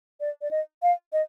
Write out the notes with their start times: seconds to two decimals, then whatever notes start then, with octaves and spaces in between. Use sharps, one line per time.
0.21 D5
0.42 D5
0.51 D#5
0.83 F5
1.13 D#5